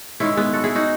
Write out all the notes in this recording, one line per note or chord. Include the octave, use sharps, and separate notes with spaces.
G#2 D#3 G#3 C#4 E4
G#3 B3
F#4 A4
E4 G#4
D#4 F#4